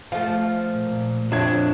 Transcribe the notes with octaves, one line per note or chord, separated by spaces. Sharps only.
F3 A3 F5
A#2
F2 D4 C#5 G#6